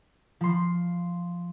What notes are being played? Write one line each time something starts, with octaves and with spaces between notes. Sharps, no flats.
F3 C6